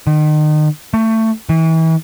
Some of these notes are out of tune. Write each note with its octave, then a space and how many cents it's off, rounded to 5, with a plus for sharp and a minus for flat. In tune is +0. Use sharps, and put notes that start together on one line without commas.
D#3 -35
A3 +20
E3 -35